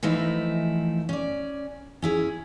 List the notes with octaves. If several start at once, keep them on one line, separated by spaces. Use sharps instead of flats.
E3 F3 A3 D#4 E4
C#4 D5
C#4 E4 G#4